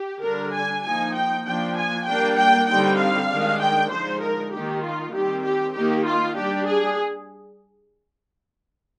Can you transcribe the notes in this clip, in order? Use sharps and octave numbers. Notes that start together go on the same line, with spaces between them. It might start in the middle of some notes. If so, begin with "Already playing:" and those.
Already playing: G4
D3 G3 D4 A#4
G#5
F3 A#3 D#4 G#5
G5
F3 A#3 D4 G5
G#5
G3 A#3 D4 G5
G5
D3 G3 C4 D#4 G5
F5
D#3 G#3 D4
G5
D3 F3 G#3 D#4 C5
A#4
D#3 A#3 D#4 G4
F4
D#3 G3 C4 G4
G4
D#3 A#3 D#4 G4
F4
G3 D4 G4
G#4